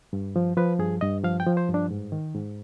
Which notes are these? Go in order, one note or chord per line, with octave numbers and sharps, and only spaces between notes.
G2
F3
F3 B4
G2 G#4
G2 D#5
F3 F5
G5
F3
C5
G2
D4
G#2
D#3
G#2